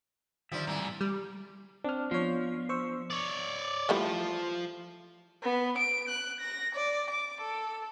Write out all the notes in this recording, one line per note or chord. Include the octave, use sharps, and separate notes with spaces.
D3 D#3 F3 G3 D5 E5
G#2 C3 E3 G3 A3 G4
G3
C4 D4 F6
F3 B3 F4 C#5
C5 C#6 E6
C#5 D5
E3 F3 G3 A3
B3
D7
F#6
A#6
D5
D6
A4